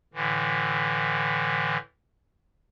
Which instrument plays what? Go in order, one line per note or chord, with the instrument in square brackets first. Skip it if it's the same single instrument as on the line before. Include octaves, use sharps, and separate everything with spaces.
[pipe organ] A2 D3 E3